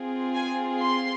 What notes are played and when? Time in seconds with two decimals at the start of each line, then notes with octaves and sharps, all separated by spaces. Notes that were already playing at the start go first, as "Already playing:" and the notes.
Already playing: C4 F4 G#4
0.34 G#5
0.83 C6